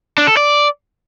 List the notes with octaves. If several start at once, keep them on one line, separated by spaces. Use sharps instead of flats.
D4
A4
D5